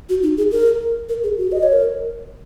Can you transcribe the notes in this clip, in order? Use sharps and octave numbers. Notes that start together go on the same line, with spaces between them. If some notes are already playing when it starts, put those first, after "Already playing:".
F#4
D#4
G#4
A#4
A#4
G#4
F#4
D#5
C#5
A#4